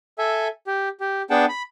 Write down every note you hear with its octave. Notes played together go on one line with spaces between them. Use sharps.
A4 E5 G#5
G4
G4
B3 D4 G#4 F#5 G5 A5
B5